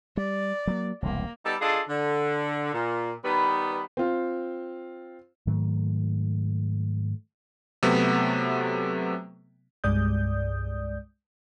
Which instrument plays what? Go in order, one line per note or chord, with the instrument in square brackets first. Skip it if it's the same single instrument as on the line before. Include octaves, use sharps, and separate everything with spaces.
[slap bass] G3 [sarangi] D5
[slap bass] F#3 A#3
[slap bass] E1 C2 C3 [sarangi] A#3
[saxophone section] G3 B3 D#4 A4
D4 F4 G#4 A4 D#5
D3
A#2
D#3 G3 B3
[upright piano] C4 F4
[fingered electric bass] G#2 D#3 F#3 A3
[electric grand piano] C3 F#3 A3 B3
[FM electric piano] C2 G2 G#3 D5 D#6 G6